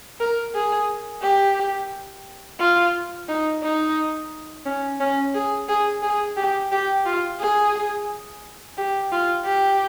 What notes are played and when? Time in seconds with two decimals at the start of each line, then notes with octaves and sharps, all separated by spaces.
0.20 A#4
0.55 G#4
1.23 G4
2.60 F4
3.29 D#4
3.63 D#4
4.66 C#4
5.00 C#4
5.34 G#4
5.69 G#4
6.02 G#4
6.37 G4
6.71 G4
7.06 F4
7.40 G#4
8.77 G4
9.12 F4
9.46 G4